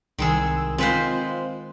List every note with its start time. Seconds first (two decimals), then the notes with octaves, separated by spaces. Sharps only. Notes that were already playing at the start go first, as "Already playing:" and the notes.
0.19 C2 D#3 G#3 G#4 E6
0.78 G#3 C4 F4 B4 C5